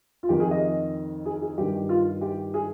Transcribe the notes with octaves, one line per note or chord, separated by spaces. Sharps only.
F4
F2 D#3 G4
G#4
D#5
G#4
G#4
G2 D#3 G4
F4
G4
G#4